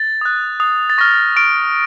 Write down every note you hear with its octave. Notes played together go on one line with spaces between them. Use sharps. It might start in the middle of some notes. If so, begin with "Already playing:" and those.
Already playing: A6
D#6 F#6
D#6 F#6
A6
C#6 F6 A#6
C#6 F6 D7